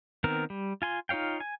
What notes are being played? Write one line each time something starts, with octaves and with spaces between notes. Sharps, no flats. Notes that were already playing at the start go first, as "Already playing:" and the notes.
D#3 B3 C4 A#4
G3
F4 G#5 C6
D#4 F4 C#5 F5 G5
G#5